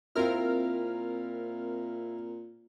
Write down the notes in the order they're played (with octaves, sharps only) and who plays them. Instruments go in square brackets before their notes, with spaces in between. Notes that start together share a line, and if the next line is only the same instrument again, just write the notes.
[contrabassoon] A#2 [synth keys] C4 A#4 F6 [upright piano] E4 F4